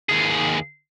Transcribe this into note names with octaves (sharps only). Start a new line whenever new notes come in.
D#2 G#4